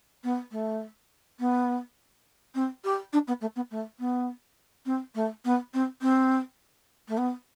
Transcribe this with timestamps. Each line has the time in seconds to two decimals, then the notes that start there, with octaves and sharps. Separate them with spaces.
0.24 B3
0.51 A3
1.39 B3
2.55 C4
2.84 G4
3.13 D4
3.28 B3
3.41 A3
3.56 B3
3.71 A3
3.99 B3
4.86 C4
5.15 A3
5.45 B3
5.74 C4
6.02 C4
7.08 A3
7.18 B3